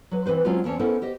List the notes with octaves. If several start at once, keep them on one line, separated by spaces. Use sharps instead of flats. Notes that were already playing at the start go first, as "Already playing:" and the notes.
F#3 B4
E3 C4 B4 C5
F#3 G#3 C4 C#4 F4 F#4
E2 A#3 C4 C#4 A5
B3 C#4 E4 A4 A#4 C5
G4 C5 D#5